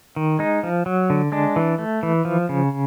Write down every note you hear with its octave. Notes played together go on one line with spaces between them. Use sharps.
D#3
G#3 D#4
F3
F#3
D3
G#3 D4
E3
A3
E3
F3
C#3